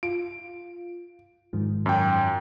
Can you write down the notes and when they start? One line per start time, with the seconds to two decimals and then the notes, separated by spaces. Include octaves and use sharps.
0.03 F4 D7
1.53 G#2 D#3 F3
1.86 F#2 G5